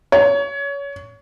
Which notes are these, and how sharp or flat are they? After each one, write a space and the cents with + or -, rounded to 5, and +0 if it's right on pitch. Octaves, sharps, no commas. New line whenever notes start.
C#5 +25